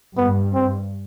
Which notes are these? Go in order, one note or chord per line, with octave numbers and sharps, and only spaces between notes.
G2 B3
C4